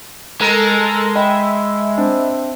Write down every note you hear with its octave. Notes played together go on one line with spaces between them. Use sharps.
G#3 A4 A#4 A#5
D#5 E5 G5 B5
C4 D4